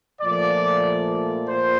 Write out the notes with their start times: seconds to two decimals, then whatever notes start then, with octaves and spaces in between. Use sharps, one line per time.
0.21 A#2 F3 A3 D5
1.49 A#2 C5